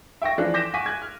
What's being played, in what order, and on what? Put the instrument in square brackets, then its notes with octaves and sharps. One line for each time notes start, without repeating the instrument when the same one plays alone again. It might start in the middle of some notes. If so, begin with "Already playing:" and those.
[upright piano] E5 G5 C#6 A#6
E3 F3 D4 A4 F5 F#6
D6 G6 A#6 B6 E7
F#5 G#5 C#6 D6 B6 D#7
F#6 G#6
F6